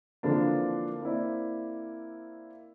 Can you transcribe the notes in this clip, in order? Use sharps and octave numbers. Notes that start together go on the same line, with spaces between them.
D3 E3 F3 A#3 C4 D4
A#3 C4 E4 D5